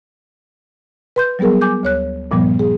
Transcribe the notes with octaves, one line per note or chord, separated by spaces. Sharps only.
B4 C6 G6
F#3 G3 B3 G#4 A#4
G#5 D6 G6
D2 C#5 F#6
G2 A#2 F3 G3 B3
G#4